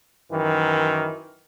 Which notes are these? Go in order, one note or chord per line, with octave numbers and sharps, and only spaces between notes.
F#2 D#3 E3